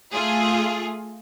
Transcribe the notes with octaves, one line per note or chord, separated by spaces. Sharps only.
A3 F4 G#4